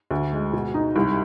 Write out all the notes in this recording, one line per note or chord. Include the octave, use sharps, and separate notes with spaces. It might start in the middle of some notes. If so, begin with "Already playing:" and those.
D2
G#3
B2
D#4
C2